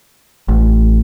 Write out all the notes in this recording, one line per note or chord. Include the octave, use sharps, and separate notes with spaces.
A1